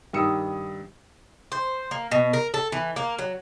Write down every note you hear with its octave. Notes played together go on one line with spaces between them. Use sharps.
G2 D#3 D#6 E6 C#7
C5
A#3
B2
A#4
A4
E3
A#3
F#3